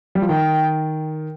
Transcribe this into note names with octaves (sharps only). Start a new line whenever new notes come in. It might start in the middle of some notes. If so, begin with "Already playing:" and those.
G3
F3
D#3 G5